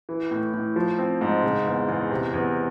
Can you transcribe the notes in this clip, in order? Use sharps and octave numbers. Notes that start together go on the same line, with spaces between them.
E3
A2
A2
F3
C4
G#2
C#3
E2
E2
C3
E2